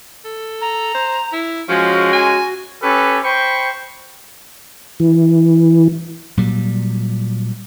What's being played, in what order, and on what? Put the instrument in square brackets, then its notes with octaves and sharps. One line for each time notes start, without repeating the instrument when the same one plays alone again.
[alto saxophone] A4
[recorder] A#5
[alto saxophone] C5
E4
[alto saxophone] F3 [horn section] G#3 C#4 [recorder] F#4
[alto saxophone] G#5
[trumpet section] C#4 G4 A4 B4
C5 G5 B5 C#6
[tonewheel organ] E3
[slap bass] A#2 F#3 G3